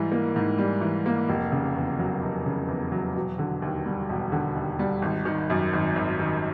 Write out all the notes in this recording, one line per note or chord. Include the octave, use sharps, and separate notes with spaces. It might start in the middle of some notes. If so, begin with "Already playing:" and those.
Already playing: G#2 E3 G3
A#3
G#2
G3
E3
A#3
F1
C#3
E2
F#3
F1
C#3
E2
F#3
E1
D3
D#2
G3
E1
D3
D#2
G3
G#1
D#3
F#2
G#1
G#1
D#3